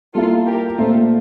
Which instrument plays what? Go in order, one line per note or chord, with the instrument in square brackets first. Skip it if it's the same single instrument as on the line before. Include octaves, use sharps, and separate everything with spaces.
[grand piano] G3 A#3 E4 [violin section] F4 A4
[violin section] G4 A#4
[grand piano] A#2 A3 C4 [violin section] F4 A4